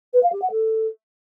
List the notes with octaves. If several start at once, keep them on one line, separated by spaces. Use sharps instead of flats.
B4
F5
G4
F#5
A4